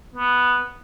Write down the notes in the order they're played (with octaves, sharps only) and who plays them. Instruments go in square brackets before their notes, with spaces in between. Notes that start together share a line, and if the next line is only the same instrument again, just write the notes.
[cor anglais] B3